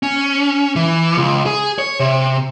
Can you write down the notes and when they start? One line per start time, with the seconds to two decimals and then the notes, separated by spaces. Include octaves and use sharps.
0.03 C#4
0.76 E3
1.18 C#2
1.46 G#4
1.78 C#5
2.00 C3